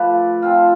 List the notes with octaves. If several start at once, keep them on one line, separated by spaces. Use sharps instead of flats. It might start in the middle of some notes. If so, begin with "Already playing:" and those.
Already playing: F3 A3 B4 D5
F3 C4 F4